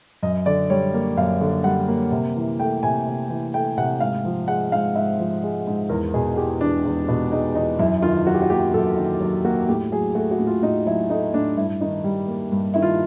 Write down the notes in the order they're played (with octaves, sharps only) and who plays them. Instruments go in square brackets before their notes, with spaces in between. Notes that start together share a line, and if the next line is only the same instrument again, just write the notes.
[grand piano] F#2 D#5
D3 D5
G3 C#5
A#3
F#2 F5
D3
G3 F#5
A#3
C3
E3
A3 G5
C3 G#5
C3
E3
A3 G5
C3 F#5
G#2 F5
F3
G#3 F#5
G#2 F5
G#2 E5
F3
G#3
G#2
E2 A#4
B2 G#4
G#3 G4
E2 D4
E2
B2
G#3 D#4
E2 D#4
F#2 E4
D#3 F4
F#3 F#4
G4
F#4
A#3 G4
F#2 A4
D#3
F#3
A#3 F#4
A2 G4
F#3 G#4
A3 F#4
F#4
A2
F4
A2 D#4
F#3 E4
A3 D#4
A2 D4
G2 E4
D#3 D#4
G3
A#3
G2
D#3 E4
F4